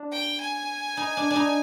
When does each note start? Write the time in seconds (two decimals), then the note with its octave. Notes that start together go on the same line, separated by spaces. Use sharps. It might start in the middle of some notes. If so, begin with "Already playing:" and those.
Already playing: D4
0.12 G5
0.41 G#5
0.97 D#4
1.17 D4
1.31 D4
1.36 D#4